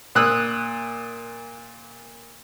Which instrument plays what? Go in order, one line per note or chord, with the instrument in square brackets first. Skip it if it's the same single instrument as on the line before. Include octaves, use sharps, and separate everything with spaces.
[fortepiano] A#2 D#6 E6 F#6